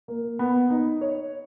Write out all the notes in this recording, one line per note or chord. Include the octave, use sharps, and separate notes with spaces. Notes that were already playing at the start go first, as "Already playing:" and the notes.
A#3
B3
D#4
C#5